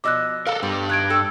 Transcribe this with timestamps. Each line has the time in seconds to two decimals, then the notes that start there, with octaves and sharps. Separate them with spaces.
0.04 B2 F3 D#5 D6 E6 F#6
0.47 A4 A#4 F5 F#5
0.63 G2 G3 B3
0.89 D#3 F#6 G#6 D7
1.10 A4 G5